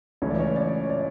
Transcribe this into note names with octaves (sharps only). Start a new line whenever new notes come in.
C#2 C#3 E3 A3 C#4 C#5
D5
C#5
D5
C#5
D5